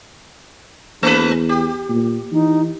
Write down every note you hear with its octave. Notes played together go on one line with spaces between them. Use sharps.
E2 A3 B4
G4
A#2
E3 D#4